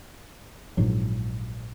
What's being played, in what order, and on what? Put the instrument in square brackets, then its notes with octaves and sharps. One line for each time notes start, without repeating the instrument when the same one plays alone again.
[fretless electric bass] A#1 G#2 D#3 F#3